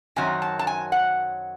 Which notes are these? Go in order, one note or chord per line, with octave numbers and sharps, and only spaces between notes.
F#2 D#3 F#3 C4 G#5
A5
A5
G#5
F#5